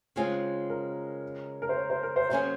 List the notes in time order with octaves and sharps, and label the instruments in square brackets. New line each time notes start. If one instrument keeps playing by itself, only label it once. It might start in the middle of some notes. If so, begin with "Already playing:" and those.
[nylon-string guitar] C#3 G#3 C4 F4 G#4
[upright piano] A#4
A#4
C5
C#5
C5
A#4
C5
[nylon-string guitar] C3 F#3 A#3 C#4 G#4 [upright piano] C5